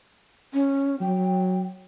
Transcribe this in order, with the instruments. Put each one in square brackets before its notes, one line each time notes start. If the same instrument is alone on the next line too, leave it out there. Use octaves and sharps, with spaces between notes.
[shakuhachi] C#4
[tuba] F#3 [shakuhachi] G5